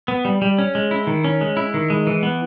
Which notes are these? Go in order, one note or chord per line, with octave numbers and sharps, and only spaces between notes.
B3
G3
G3
C#4
G#3
E4
D#3
C#4
G#3
E4
D#3
G#3
E3
B3